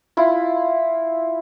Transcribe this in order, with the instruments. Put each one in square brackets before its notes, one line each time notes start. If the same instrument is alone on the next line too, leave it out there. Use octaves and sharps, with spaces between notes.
[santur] E4 F4